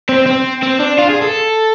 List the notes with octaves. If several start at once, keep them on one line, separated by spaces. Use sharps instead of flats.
C4
C4
C4
D4
F4
G#4
A4